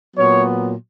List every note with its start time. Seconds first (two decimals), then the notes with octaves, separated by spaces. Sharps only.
0.17 A#2 F#3 B3 C#5